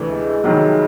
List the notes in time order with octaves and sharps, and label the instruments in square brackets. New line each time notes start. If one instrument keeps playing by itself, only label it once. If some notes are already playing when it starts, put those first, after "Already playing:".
Already playing: [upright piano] D2 C3 E3 A3 D4
[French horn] G#3
[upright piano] F2 C3 D#3 F#3